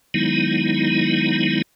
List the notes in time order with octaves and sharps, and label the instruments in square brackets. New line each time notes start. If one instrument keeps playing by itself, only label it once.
[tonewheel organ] D#3 F#3 G#3 B3 D#4 E4